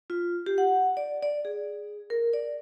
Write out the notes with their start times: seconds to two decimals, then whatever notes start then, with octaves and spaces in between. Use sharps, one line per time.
0.10 F4
0.46 G4
0.58 F#5
0.97 D5
1.23 D5
1.45 G#4
2.10 A#4
2.33 D5